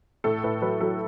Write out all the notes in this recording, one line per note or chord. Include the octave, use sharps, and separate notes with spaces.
A2 A4
A2 B4
F#3 B4
F#3 A4